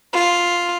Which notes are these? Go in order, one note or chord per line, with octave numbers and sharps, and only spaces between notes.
F4